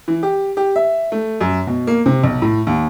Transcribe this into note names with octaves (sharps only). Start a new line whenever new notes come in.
E3
G4
G4
E5
A3
F#2
B2
A#3
C3
B1
A2
D#2